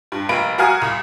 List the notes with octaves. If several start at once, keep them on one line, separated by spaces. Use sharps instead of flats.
G2
F1 A#3 B5 D7
F#4 A#4 F5 G#5 D#6
C2